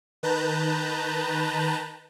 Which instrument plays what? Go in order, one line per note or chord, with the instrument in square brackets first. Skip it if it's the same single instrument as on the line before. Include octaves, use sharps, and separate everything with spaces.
[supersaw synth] D#3 B4 A5 A#5 F#6 G6